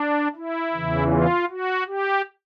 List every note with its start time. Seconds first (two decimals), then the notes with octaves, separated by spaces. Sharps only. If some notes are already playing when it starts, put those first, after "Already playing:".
Already playing: D4
0.36 E4
0.73 E2 C#3 E3
1.11 F4
1.50 F#4
1.87 G4